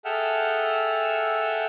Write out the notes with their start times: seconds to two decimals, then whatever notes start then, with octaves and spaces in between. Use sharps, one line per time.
0.05 G#4 A4 E5 F#5 G5 F6